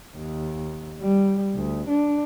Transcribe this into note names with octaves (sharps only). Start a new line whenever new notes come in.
D#2
G3
D2
D4